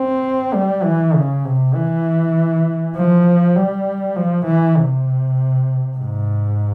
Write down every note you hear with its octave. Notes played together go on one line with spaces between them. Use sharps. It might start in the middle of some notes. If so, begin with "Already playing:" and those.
Already playing: C4
G3
E3
C#3
C3
E3
F3
G3
F3
E3
C3
G#2